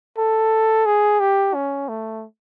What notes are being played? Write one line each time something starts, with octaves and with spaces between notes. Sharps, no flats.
A4
G#4
G4
C#4
A3